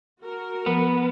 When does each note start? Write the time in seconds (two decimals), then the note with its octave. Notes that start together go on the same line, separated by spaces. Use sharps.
0.21 F#4 A#4
0.66 F3 B3